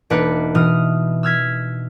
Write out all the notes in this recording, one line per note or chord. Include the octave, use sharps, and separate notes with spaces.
E1 A#3 D4 D#4 B4 C#7
B2 E3 D#6 F6
E6 F6 G#6 B6